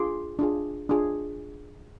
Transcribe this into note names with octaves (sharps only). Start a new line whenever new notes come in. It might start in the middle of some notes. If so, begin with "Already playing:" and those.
Already playing: D4 F4 G#4 C6 D6
D4 F4 G#4
D4 F4 G#4